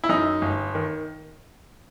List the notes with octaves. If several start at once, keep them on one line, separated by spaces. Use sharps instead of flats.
E4
F#2 D#4
G1
D#3